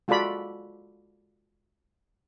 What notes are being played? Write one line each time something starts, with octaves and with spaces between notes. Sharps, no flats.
G#3 F4 F#4 A4 D5 B5